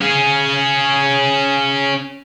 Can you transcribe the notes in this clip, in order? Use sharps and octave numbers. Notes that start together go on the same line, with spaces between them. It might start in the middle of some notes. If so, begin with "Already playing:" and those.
C#4 G#4